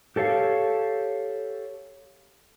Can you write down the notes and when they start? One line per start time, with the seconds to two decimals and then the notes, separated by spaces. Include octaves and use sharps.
0.16 G4 A4 C#5 F5